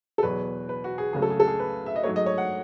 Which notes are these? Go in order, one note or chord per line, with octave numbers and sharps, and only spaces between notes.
A4
E2 B2 F#3 B4
B4
F#4
G#4
C#2 C#3 F#3 A3 G#4
A4
G#4
A4
G#4
B4
E5
D#5
G#2 F#3 A3 C#5
D#5
C#5
F#5